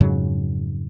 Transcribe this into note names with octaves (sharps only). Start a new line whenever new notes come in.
F2 G#2 C#3 F#3